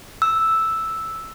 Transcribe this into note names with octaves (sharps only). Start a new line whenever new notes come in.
E6